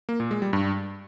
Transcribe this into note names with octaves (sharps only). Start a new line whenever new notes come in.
A#3
A#2
G#3
G3
G2